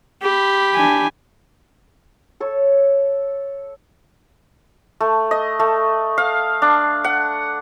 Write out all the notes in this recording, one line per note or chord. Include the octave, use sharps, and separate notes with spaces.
G4 B5
D4 G#5
A4 C#5
A3
D#5
A3
F5
D4
F#5